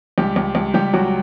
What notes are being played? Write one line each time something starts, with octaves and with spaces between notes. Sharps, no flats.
C#2 G3 G4
C#2
C#2
C#2 G3 G4
C#2 F#3 F#4